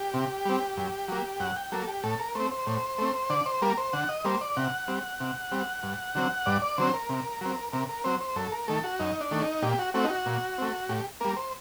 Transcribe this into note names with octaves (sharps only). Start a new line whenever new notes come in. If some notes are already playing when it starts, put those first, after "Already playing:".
Already playing: G4
C3
G3 C4
F#2
F#3 A#3
F#2 F#5
G5
F#3 A#3 A4
G4
A2 A4
A#4
A3 C4 C5
C5
A2
A3 C4
D3 D5
C5
G3 A#3 A#4
C5
D3 F#5
D#5
G3 A#3 C5
D5
C3 F#5
G3 C4
C3
G3 C4
G2
D3 F#3 C4
G2 D5
D5
D3 F#3 C4 C5
A#4
C3
F#3 C4
C3 A#4
A#4
F#3 C4 C5
C5
F#2 A4
A#4
D#3 A3 A4
F#4
F#2 D#4
D4
D#3 A3
D#4
A#2 G4
F#4
A3 C4 F#4
D#4
F#4
A#2
A3 C4
A2 G4
G3 A#3 A#4
C5